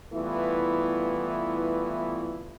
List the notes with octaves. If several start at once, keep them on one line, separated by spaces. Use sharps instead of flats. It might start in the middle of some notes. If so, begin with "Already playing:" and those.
E3 G3 A3 B3 E4 F4